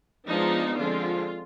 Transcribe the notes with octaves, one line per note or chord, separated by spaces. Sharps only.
F3 G#3 B3 D4 D#4
D3 F3 G#3 C4 F4